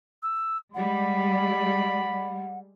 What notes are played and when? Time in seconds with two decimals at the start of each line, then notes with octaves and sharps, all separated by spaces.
0.22 E6
0.74 G3 G#3 D5 F#5 B5